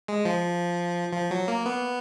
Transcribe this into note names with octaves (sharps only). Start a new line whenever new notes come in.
G#3
F3
F3
F#3
A#3
B3